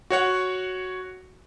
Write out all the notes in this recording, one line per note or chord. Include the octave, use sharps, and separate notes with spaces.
F#4 C#5 F#5